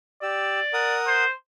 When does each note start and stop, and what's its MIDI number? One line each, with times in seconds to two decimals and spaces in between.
0.23 0.60 67
0.23 0.97 74
0.23 0.60 88
0.73 1.24 70
0.73 1.24 78
0.73 1.24 87
1.07 1.32 72